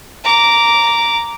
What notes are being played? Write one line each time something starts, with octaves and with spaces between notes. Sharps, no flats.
A#5 D6